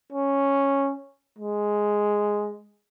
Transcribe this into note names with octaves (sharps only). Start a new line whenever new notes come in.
C#4
G#3